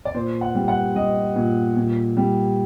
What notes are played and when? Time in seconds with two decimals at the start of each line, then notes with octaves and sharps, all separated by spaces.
0.05 D5
0.14 A#2 C5
0.41 F#5
0.55 G3
0.68 F#5
0.95 G3 D#5
1.36 A#2
1.76 A#2
2.17 G3